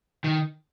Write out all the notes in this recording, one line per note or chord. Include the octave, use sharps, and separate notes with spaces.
D#3